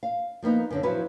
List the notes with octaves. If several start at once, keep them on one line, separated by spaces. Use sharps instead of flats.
F5
F3 A#3 B3 D#4
F#2 D3 C#4
F3 F#3 E4 B4